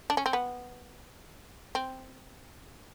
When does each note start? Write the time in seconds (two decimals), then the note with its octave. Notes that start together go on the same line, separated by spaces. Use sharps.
0.10 D4
0.17 C#4
0.26 C4
0.33 B3
1.75 C4